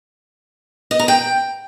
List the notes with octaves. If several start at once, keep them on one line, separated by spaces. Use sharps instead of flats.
D#5
A#5
G5